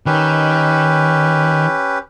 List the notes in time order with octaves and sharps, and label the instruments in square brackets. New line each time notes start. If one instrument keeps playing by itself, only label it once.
[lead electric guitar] D#3 [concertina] C#4 G4 B4